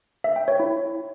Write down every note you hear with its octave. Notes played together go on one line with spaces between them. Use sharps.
E5
G5
C#5
E4